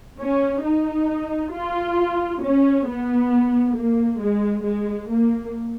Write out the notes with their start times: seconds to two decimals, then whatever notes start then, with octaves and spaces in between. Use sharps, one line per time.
0.21 C#4
0.65 D#4
1.54 F4
2.42 C#4
2.88 B3
3.77 A#3
4.21 G#3
4.65 G#3
5.10 A#3